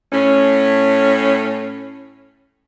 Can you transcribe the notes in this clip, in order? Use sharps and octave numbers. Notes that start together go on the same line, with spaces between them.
A2 C#4